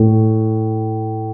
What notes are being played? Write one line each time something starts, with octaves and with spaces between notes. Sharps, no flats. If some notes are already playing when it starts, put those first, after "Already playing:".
Already playing: A2